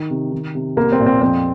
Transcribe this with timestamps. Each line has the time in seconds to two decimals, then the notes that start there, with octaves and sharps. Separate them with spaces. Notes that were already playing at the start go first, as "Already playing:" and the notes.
Already playing: D#3
0.11 C3
0.32 D#3
0.55 C3
0.76 C2 A#3
0.92 C4
1.00 A#2
1.06 C4
1.21 F2 C4